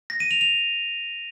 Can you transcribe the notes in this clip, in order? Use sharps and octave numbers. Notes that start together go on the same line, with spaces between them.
A#6
D#7
F7
F7